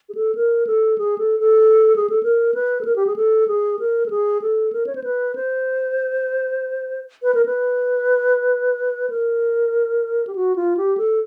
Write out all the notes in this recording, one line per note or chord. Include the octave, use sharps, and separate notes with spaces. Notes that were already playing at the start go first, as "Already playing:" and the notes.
G#4
A4
A#4
A4
G#4
A4
A4
G#4
A4
A#4
B4
A4
A#4
G4
G#4
A4
G#4
A#4
A4
G#4
A4
A#4
C#5
C5
B4
C5
B4
A#4
B4
A#4
G4
F#4
F4
G4
A4